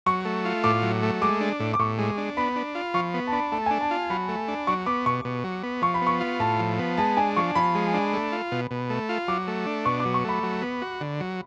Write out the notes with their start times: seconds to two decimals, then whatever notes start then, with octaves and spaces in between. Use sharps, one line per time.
0.06 F#3 C#6
0.25 A3
0.45 F4
0.64 A2 D6
0.83 F#3
1.03 A3
1.21 G#3 D6
1.41 D4
1.60 A2
1.74 D6
1.79 A2 C#6
1.99 G#3
2.17 D4
2.37 B3 B5
2.56 D4
2.75 F4
2.94 F3 C#6
3.14 B3
3.27 A5
3.32 D4 B5
3.52 A3 A5
3.66 D4 G#5
3.81 A5
3.91 F4
4.10 F#3 B5
4.29 A3
4.48 D4
4.67 F#3 C#6
4.86 B3 D6
5.06 B2 C#6
5.25 B2
5.44 F#3
5.63 B3
5.82 F3 C#6
5.94 B5
6.02 B3
6.07 C#6
6.21 F4
6.39 A2 A5
6.60 F3
6.79 B3
6.98 G#3 A5
7.17 D4 G#5
7.36 F3 C#6
7.55 F3 B5
7.75 G#3
7.94 D4
8.13 A3
8.32 F4
8.52 B2
8.71 B2
8.90 A3
9.09 F4
9.28 F#3 D6
9.48 A3
9.66 D4
9.85 B2 C#6
10.00 D6
10.05 F#3
10.14 C#6
10.24 A3 B5
10.43 F#3
10.62 B3
10.82 F#4
11.01 D3
11.20 F#3